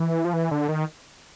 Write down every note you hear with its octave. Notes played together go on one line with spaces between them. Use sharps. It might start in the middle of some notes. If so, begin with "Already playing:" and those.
Already playing: E3
F3
E3
D3
D#3